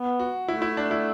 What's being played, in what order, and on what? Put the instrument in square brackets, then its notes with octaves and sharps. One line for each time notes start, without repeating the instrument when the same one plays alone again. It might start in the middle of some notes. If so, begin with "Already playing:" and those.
Already playing: [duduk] B3
[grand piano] F#4
[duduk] A3 [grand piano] E4
[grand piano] E4
D4
E4